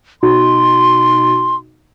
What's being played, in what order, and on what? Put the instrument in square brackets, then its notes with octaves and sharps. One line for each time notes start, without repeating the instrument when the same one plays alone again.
[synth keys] B2 D#4 F#4 [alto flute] C6